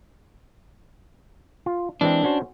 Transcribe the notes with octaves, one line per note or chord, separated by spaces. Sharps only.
F4
E3 G#3 C4 D4
C#4 F#4 C5